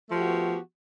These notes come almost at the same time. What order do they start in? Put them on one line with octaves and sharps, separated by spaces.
A3 F3 G4 F#4 B3